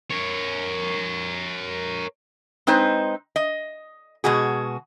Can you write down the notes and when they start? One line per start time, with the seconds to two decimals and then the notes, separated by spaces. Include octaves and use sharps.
0.10 A#4 C#5
2.67 G#3 C4 D#4 B4 C5
3.36 D#5
4.24 B2 G#3 F#4 G#4